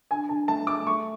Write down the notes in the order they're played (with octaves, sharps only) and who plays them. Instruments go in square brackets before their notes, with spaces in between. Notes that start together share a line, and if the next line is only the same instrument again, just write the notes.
[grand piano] D3 G#5
D3 A5
A3 A5
A3 D6
A3 C#6